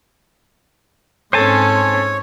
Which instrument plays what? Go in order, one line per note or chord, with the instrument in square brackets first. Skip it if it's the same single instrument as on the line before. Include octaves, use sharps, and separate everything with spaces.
[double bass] G#2 C4 [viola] C#4 A4 [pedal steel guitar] C5 G#5 A5 [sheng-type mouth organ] C#5